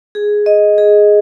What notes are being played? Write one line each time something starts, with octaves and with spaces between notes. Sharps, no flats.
G#4
D#5
G#4